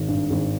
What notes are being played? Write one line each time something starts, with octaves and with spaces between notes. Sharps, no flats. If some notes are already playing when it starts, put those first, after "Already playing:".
Already playing: G#1
G2
G#1